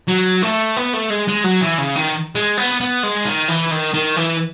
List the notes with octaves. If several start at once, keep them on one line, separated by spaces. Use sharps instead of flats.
F#3
A3
B3
A3
G#3
G#3
F#3
E3
C#3
D#3
G#3
B3
B3
G#3
D#3
E3
D#3
D#3
E3